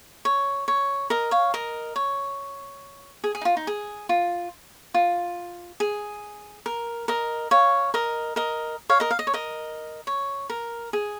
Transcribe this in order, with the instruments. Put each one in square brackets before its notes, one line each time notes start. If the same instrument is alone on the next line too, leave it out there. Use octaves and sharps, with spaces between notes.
[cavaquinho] C#5
C#5
A#4 D#5
C#5 F5
A#4 D#5
C#5
G#4
G#4
D#4
F4
D#4
G#4
F4
F4
G#4
A#4
A#4 D#5
C#5 F5
A#4 D#5
A#4 D#5
C#5 F5
A#4 D#5
F5
D#5
C#5
A#4 D#5
C#5
A#4
G#4